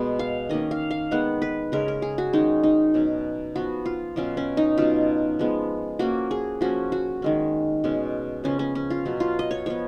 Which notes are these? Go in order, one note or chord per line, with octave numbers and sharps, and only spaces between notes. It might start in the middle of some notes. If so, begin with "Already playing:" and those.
Already playing: B2 G#3 B3
F5
D#3 A#3 C#4 D#5
F5
F5
D#3 G#3 B3 F#5
B4
C#3 G#3 C#4 A#4
A#4
G#4
F#4
D#3 G#3 C#4 D#4
D#4
B2 F#3 C#4
F3 B3 F#4
F4
B2 F#3 C#4 F4
C#4
D#4
B2 F#3 C#4 F4
F3 G#3 B3
F3 A#3 C#4 F#4
G#4
F3 A#3 C#4 F#4
F#4
D#3 G#3 C#4
B2 G#3 C#4
C#3 F3 B3 C#4
C#4
C#4
F4
B2 F#3 C#4
F4
D#5
C#5
F3 B3 C#5